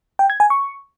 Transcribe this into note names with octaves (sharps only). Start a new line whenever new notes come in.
G5
G#6
G#5
C#6